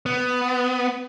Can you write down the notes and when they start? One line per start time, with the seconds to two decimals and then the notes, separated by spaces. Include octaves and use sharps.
0.06 B3